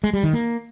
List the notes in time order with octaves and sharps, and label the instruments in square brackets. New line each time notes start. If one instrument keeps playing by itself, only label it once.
[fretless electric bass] G#3
G3
D#3
A#3